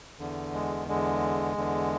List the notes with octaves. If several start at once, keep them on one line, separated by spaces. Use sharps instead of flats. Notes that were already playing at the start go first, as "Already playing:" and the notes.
E2 D3
G#3
E2 D3 G#3
E2 D3